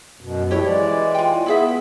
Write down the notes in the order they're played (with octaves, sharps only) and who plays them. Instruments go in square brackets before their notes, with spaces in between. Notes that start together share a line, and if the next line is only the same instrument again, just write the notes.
[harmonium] F#2 B2
[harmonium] F3 E4 [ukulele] G4 C#5
[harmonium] E3 G#3 D5
[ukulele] F4 G5
[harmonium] B3 [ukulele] E4 G#4 E5